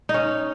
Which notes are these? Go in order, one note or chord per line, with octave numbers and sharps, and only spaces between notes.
D#4
C#4